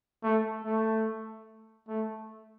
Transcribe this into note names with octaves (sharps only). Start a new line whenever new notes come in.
A3
A3
A3